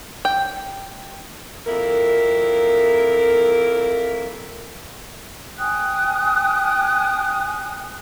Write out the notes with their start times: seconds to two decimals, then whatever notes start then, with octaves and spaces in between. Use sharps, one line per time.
0.25 G5
1.67 F2 A#3 E4 A#4
5.59 G5 G#5 D#6 F#6